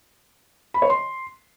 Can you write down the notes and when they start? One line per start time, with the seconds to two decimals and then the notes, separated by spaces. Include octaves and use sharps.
0.74 B5
0.82 C#5
0.90 C6